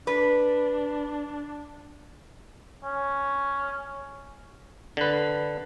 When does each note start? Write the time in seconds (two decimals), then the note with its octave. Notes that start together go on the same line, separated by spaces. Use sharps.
0.07 D4 B4
2.84 C#4
4.97 D3 B4